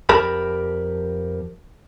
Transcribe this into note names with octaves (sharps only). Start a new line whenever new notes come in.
F2 G4 A#4 A5 B5